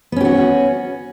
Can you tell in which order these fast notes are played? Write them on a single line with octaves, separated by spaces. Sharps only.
B3 C#4 G4 F#4